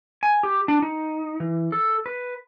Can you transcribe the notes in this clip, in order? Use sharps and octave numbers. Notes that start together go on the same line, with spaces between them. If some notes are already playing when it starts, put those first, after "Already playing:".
G#5
G4
D4
D#4
E3
A4
B4